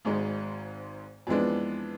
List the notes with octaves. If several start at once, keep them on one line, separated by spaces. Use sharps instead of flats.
G#1 G#2 G#3
F2 E3 G#3 B3 D4